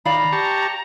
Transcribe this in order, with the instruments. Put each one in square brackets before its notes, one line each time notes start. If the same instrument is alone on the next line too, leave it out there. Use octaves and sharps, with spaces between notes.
[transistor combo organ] D#3 [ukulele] D5 F5 B5 [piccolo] A#5
[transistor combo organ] G4 A5 C#6